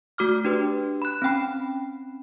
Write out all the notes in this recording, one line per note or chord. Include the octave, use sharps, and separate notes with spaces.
A3 F#4 D6 F6
D4 G4 B4
B5 F#6
C4 C#4 G5 B5